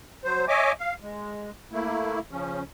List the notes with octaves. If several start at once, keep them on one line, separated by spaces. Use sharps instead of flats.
F#3 C5
C#5 D#5 E5 G#5 D6
F5
G#3
A3 A#3 E4
C#3 F3 C#4